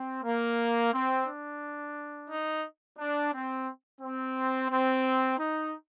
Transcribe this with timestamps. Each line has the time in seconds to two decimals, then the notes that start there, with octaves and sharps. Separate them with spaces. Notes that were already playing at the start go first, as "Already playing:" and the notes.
Already playing: C4
0.24 A#3
0.93 C4
1.27 D4
2.30 D#4
2.98 D4
3.33 C4
4.01 C4
4.70 C4
5.39 D#4